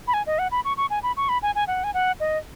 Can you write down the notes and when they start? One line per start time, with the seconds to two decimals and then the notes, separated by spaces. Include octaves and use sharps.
0.08 B5
0.14 G#5
0.26 D#5
0.39 F#5
0.51 B5
0.65 C#6
0.77 C#6
0.90 G#5
1.03 B5
1.17 C#6
1.29 B5
1.43 G#5
1.55 G#5
1.68 F#5
1.84 G#5
1.94 F#5
2.20 D#5